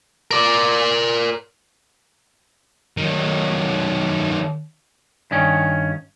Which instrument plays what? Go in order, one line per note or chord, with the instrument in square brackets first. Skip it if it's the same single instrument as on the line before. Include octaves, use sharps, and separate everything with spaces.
[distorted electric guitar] A#4 D5
D#3 F#3
[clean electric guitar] G2 D#3 C#4